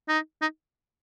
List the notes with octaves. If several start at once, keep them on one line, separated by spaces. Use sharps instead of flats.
D#4
D#4